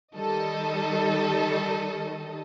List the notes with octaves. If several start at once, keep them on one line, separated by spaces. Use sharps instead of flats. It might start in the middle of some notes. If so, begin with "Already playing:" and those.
D#3 G3 A4 D#5